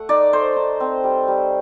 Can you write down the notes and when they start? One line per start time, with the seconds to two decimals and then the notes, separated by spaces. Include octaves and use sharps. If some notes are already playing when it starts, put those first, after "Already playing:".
Already playing: A3 F#5
0.09 D#4 D5
0.33 A3 C5
0.56 D#4
0.80 C4
1.04 G3
1.28 G3